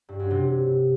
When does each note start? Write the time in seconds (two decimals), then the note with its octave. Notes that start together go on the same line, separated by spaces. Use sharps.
0.09 G2
0.20 F#2
0.30 C3